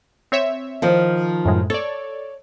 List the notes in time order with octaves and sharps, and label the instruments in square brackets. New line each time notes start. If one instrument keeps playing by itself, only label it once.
[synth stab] C4 C#5 E5
[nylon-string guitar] D#3 F3
[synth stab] F#2 A2 G#3
[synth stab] A4 D5 [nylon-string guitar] C#5